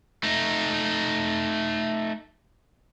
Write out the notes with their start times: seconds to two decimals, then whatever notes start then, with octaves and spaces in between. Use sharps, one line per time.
0.24 A3 D#4